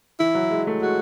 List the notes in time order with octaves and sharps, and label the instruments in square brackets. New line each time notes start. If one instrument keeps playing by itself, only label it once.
[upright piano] E3 [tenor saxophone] E4
[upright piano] F#3
G#3
A3
[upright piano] G#3 [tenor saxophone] F#4